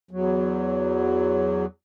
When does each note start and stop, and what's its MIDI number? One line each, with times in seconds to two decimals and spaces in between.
0.11 1.65 40
0.11 1.65 54